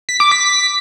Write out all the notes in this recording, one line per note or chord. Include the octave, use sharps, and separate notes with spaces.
B6
D6
B6